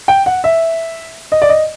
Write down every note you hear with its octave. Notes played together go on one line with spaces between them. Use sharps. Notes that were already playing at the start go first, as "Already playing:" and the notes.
G5
F#5
E5
D#5
D5
D#5